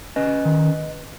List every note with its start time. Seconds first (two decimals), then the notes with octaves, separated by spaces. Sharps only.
0.16 C#4 B4 D#5
0.45 D#3